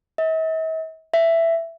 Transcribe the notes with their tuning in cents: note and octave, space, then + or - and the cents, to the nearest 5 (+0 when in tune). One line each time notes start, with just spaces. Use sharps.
E5 -45
E5 +10